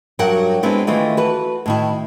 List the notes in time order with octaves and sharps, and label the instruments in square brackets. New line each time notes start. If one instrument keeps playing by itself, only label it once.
[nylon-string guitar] G2 F#3 F#4 A#4 F#5 G5
G#3 B3 C4 D4 E4
D#3 E3 A3 F4
F#4 A4 B4
A2 D#3 E4